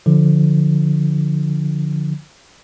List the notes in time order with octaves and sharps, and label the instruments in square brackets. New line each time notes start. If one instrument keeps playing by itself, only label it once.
[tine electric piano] D3 F3